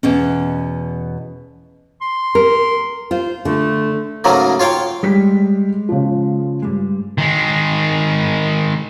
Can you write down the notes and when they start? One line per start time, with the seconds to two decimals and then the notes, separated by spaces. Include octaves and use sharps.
0.03 E2 B2 C#4
2.01 C6
2.35 A#4
3.11 F4 C5
3.45 D3 A3
4.24 G#2 C#3 F#3 A3 A#3
4.60 F4 C#5 F5 G5
5.03 G3 G#3 B6
5.89 C#3 F3
6.62 G2 G3 G#3
7.18 D#3 G#3